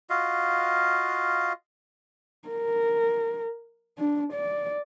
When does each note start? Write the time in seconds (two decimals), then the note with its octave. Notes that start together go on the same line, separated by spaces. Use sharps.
0.10 F4 F#4 D#5 F5
2.49 A#4
3.98 D4
4.33 D5